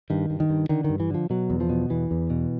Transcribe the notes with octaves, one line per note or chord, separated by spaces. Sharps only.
G2 D#3
G2
D#3
G2
D3 D#3
G2 D#3
E3
D3 F3
B2 F#3
E2
F3
B2
E2 E3
E2
B2